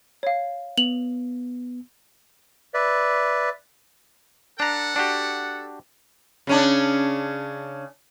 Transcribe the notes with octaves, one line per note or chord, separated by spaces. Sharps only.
C#5 F5
B3 F7 F#7
B4 D5 E5
D4 A4 F#5 A#5
D4 F#4 G4
C#3 C#4 D4